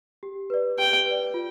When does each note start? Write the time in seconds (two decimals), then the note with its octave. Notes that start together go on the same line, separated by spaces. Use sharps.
0.23 G4
0.50 B4 D5
0.78 G4 G5
1.06 B4 D5
1.34 F4